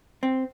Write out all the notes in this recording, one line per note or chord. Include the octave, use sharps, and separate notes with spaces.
C4